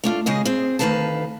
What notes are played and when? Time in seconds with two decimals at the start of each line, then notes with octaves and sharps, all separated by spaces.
0.04 A3 D4 F4
0.26 C#3 G#3 G#4 D#5
0.45 C4 G#4
0.79 D2 G#2 D#3 B4 F5 A5